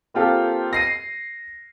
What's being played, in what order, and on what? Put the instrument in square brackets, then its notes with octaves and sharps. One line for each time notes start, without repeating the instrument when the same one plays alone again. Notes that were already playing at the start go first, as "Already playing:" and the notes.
[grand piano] A#3 C4 F4 G4 A4
A#6 C7 D#7